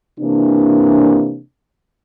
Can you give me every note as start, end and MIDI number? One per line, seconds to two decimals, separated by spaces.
0.19 1.40 48
0.19 1.40 52
0.19 1.40 58
0.19 1.40 62